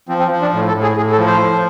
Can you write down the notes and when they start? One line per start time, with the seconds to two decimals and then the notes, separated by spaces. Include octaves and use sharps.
0.09 F3 C4
0.19 C4
0.31 F3
0.42 D4
0.53 A2
0.68 A4
0.75 A2
0.83 G#4
0.97 A2 G#4
1.12 A4
1.19 F3
1.27 C5
1.41 F3